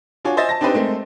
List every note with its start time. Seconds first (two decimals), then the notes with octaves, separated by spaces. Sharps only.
0.25 D4 F4 F#4 C#5 G#5
0.37 C5 D#5 E5 G#5 A6
0.49 A5 A#6
0.61 C4 D4 D#4 G4 B4 C5
0.74 G#3 A3 C4 A#4